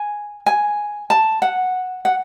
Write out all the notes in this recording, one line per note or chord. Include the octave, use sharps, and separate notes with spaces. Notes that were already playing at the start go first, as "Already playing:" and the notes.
Already playing: G#5
G#5
A5
F#5
F#5